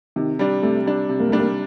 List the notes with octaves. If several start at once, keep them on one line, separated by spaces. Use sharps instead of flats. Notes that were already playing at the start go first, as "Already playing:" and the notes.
C3 D#3
G3 D4
C3 A3
G3 D4
C3
A#3
G3 A3 D4
A#3